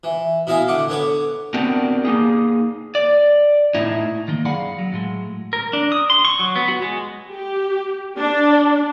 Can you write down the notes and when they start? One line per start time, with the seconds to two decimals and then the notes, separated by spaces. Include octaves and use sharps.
0.04 E3
0.47 B2 E4 D#5 F5 G#5 A#5
0.68 D3 F#5 D6
0.89 D3 B3 C#5 D6
1.54 B3 C4 D4 F#4 G4 A#4
2.05 A#3 D#4 G#4
2.95 D5
3.74 A2 D#4 E4
4.28 D#3 A#3 D#4
4.45 F#2 G#4 D5 F5 F#5 B5
4.78 F#3
4.92 A2 F#3 G#3
5.53 A#4
5.73 D4
5.92 D#6
6.10 C6
6.25 C#6
6.39 F#3
6.56 B3
6.68 F#4
6.82 G#3
7.29 G4
8.18 D4